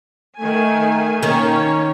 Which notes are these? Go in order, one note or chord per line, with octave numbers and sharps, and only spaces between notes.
D#3 A3 G#5
D#3 A#3 C#4 C#5